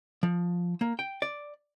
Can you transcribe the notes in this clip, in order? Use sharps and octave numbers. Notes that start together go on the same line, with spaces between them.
F3
A#3
G5
D5